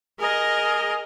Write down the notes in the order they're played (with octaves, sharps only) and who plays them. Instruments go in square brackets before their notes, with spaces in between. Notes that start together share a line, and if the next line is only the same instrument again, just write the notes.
[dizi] G#4 [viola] A#4 D#5